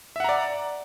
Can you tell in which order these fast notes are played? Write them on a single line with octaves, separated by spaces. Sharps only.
E5 F#5 A#5 D5